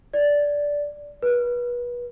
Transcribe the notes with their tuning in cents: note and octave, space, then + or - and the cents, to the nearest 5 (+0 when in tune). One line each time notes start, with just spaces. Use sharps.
D5 -10
B4 -30